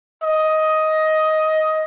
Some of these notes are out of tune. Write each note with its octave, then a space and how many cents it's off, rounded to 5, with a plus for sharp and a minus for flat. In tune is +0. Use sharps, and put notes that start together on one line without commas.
D#5 +10